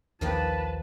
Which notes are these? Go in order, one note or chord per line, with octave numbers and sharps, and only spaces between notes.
A#1 D#2 D#3 F3 A#3 B4 A5